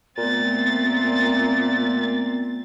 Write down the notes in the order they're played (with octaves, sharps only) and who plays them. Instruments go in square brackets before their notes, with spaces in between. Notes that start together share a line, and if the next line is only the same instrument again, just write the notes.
[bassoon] A#2 [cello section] A3 C4 [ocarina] B3 [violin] A6